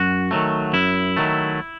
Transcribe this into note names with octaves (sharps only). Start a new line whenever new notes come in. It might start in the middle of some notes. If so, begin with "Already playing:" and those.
Already playing: F#2 F#4
D#3 F#3 A3
F#2 E4
D#3 F#3 A3